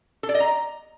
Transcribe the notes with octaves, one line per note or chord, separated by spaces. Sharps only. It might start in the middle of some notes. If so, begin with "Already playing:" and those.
A4
D5
D#5
A#5